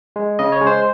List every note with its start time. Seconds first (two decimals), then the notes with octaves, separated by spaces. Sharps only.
0.16 G#3
0.39 C#3 D#5
0.52 C#5
0.61 G#3
0.67 C5